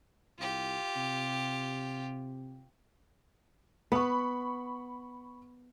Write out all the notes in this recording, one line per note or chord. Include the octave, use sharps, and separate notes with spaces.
C2 F4 G4
C3
B3 B5 C#6